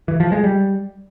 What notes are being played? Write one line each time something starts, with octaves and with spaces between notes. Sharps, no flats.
E3
F3
G#3
G3